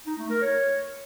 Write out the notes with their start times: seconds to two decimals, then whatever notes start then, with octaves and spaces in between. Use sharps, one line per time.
0.06 D#4
0.18 A3
0.30 A#4
0.42 C#5